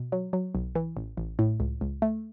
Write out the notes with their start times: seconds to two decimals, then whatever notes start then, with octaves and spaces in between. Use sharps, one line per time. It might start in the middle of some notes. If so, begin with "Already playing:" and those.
Already playing: B2
0.12 F#3
0.33 F#3
0.55 B1
0.75 E3
0.97 A1
1.17 A1
1.39 A2
1.60 C#2
1.81 C#2
2.02 A3